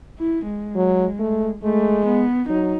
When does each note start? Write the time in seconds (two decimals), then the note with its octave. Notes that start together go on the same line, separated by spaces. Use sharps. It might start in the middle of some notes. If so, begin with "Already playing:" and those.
0.19 E4
0.47 G#3
0.76 F#3
1.19 A3
1.63 G#3 A3
2.06 B3
2.49 F#3 D#4